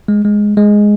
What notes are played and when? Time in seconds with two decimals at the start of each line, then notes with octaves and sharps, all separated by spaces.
0.08 G#3
0.25 G#3
0.57 G#3